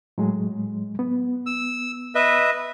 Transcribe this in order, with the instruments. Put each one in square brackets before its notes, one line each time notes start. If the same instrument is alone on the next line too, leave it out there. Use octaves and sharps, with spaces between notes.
[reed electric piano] A2 F#3 G#3
B3
[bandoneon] E6
B4 D#5 E5